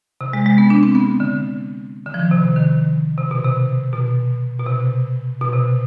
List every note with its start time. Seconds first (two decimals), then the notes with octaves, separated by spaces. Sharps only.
0.21 C3
0.33 G#3
0.46 G#3
0.58 B3
0.70 D4
0.83 C4
0.95 B3
1.20 D3
2.06 D3
2.14 F3
2.19 D#3
2.31 C3
2.43 C3
2.56 D#3
3.18 C3
3.31 B2
3.45 C3
3.93 B2
4.59 B2
4.66 C3
5.41 B2
5.53 C3